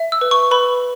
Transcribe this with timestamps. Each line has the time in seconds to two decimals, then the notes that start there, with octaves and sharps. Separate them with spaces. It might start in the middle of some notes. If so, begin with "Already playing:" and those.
Already playing: E5
0.12 E6
0.21 B4
0.31 C#6
0.51 B4 B5